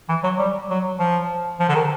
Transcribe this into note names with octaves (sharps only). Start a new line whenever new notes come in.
E3
F#3
G3
F#3
F3
F3
D3
D#3